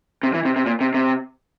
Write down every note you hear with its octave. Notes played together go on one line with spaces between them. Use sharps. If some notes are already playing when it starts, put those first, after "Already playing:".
C3
E3
C3
C3
A#2
C3
C3